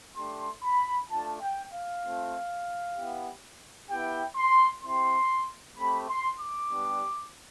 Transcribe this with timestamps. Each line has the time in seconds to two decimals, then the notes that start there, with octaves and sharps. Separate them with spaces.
0.17 A3 D4 G4 C6
0.64 B5
1.09 A3 D4 F4 A5
1.41 G5
1.72 F5
2.03 A3 C4 F4
2.96 B3 E4 G4
3.90 B3 E4 G4 G5
4.37 C6
4.84 C4 E4 G4 C6
5.77 A3 C4 G4 B5
6.09 C6
6.40 D6
6.71 G3 B3 D4 G4